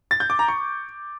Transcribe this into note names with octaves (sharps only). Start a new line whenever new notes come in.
A6
G6
D6
A#5
C#6